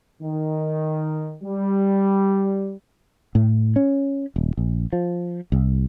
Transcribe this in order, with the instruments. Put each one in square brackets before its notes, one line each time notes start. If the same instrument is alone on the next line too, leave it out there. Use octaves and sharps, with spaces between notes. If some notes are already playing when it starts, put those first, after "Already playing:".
[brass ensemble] D#3
G3
[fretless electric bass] A2
C#4
D#1
A#1
F3
C2